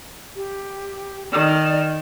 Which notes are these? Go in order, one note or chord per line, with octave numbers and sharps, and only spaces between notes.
G4
D#3 D5